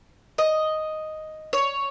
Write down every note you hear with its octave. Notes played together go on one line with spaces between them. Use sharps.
D#5
C#5